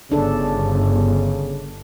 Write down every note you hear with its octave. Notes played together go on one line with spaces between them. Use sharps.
G1 C#3 D4 A4